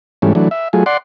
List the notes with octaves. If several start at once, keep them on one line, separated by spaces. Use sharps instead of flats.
G#2 E3 G3 A3 C#4
E3 F#3 A3 D4
E5
F#3 A3 F4 G#4
D5 F#5 C6